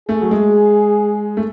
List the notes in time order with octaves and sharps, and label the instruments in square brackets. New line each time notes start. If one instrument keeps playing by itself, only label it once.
[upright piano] A3 [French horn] G#4
[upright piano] F#3
G#3
A3